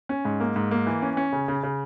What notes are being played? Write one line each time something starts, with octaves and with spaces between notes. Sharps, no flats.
C#4
G#2
A#3
G#2
A#3
E3
C#4
C#4
C#3
C#3
C#3